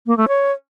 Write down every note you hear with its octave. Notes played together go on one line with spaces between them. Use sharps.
A#3
A3
C#5